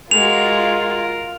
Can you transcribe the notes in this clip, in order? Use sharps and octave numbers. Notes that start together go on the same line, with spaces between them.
G#3 F4 F#4 A#4 F7